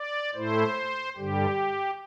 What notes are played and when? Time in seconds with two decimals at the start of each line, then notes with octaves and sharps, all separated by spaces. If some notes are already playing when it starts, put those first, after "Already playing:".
Already playing: D5
0.35 A2 A3 E4 C5
1.17 G2 D3 G3 G4